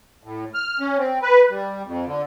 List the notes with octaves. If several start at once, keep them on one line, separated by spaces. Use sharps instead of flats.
A2
F6
C#4
C4
B4
G3
F2
D3